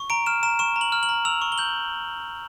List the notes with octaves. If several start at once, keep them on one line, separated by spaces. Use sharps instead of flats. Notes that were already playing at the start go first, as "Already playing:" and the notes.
Already playing: C#6
A#5 D7
F6 E7
A#5 E7
C#6 E7
A#5
F#7
F6
F#7
A#5
E6 F7
C#6
G7
G6 F#7